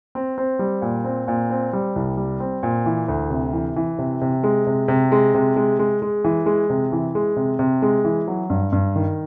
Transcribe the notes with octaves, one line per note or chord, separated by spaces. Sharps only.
C4
C4
G3
A#2
C4
A#2
C4
G3
C2
G3
C4
A#2
E3
D2
C3
E3
E3
C3
C3
G#3
C3
C3
G#3
C3
G#3
G#3
G#3
E3
G#3
C3
E3
G#3
C3
C3
G#3
E3
F#3
G2
G2
D#3